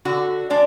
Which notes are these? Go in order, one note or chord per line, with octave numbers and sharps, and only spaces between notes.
D3 F#4
G#3 D4 D5